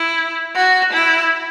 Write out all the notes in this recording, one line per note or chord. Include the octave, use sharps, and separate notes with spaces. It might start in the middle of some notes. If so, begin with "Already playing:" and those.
Already playing: E4
F#4
E4